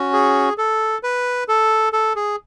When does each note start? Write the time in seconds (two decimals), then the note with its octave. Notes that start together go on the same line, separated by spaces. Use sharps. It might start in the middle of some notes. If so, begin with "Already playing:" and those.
Already playing: C#4 F#4
0.13 G#4
0.58 A4
1.03 B4
1.48 A4
1.93 A4
2.16 G#4